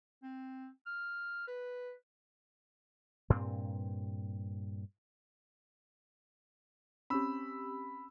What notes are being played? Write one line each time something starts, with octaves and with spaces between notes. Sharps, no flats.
C4
F6
B4
G2 A#2 C4
C4 C#4 G4 B5 E6